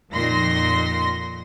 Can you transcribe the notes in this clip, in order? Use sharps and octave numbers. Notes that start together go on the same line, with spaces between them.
F2 A#2 D#3 C6 A#6